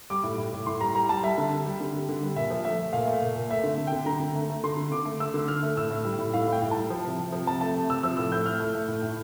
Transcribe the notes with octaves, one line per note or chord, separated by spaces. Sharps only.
G3 D6
A2
A2
A2
A2 C6
G3 A#5
G3 A#5
G3 A5
G3 E5
D3
G3
G3
D3
G3
D3
G3
A#2 E5
F3
A3 E5
A3
A#2 F5
A3
A#2
A#2
A3 E5
D3
D3
G5
D3
D3 A#5
D3
A3
A3
D3 C6
D3
D3 D6
A3
A3 E6
D3
D3 F6
A3
A2 E6
A2
G3
A2
A2 F5
A2 G5
A2
G3 A5
F3
C3
C3
F3
C3 A5
A3 A5
C3
C3 E6
F3 E6
A2 E6
A2 G6
A3 F6
A3
A3
A2
A2